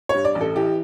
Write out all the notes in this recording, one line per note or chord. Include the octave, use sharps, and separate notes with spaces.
G2 C#5
D5
A1
A4
E3 G4